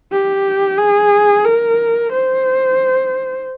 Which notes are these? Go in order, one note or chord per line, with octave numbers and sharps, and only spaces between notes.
G4
G#4
A#4
C5